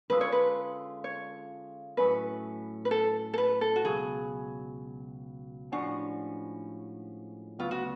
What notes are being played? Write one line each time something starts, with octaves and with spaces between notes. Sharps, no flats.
D3 G#3 C#4 F4 A4 B4
C#5
B4
C#5
A2 F#3 A3 C#4 B4
B4
A4
A4
B4
A4
F#4
C#2 B2 F#3 G#4
A2 F3 G#3 C#4 D4 F#4
D2 C#3 F#3 B3 F4
F#4